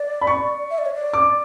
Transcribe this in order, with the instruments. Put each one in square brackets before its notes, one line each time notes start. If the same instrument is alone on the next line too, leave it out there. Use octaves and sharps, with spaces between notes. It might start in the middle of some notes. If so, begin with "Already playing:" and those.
Already playing: [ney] D5
[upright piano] B5
C#6
[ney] E5
D5
C#5
D5
[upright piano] D6